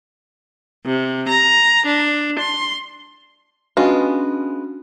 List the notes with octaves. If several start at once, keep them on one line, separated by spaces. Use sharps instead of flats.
C3
A#5
D4
C6
G#3 B3 C#4 D4 F4 F#4